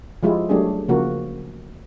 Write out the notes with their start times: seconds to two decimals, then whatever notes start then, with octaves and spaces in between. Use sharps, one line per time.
0.23 F3 G#3 E4 F4 G4
0.49 F#3 G3 A3 D4 G4 G#4
0.88 C#3 F3 A#3 F#4